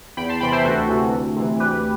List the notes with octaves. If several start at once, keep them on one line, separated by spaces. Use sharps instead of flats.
E2 G5 B5
A5 C6
C3 E3 G5 B5
C5 E5
D2 F#4 A4
C3 E3
D2
C3 E3
D2 G4 B4